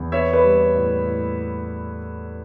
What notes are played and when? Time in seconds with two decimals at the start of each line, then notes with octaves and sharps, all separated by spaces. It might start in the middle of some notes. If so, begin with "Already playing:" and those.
Already playing: E2
0.12 B3 C#5 E5
0.33 B4 D5
0.43 G3
0.55 C#5
0.75 A2
1.06 A2